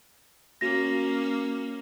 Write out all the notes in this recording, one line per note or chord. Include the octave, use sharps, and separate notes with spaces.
A#3 C#4 F#4 A#6